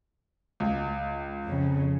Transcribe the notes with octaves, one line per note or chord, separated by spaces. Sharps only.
C#2
F2 C#3